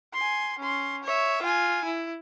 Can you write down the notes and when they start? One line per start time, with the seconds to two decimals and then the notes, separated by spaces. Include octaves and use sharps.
0.14 G#5 C6
0.58 C#4 C6
1.03 C#5 E5
1.42 F4 G#5
1.85 E4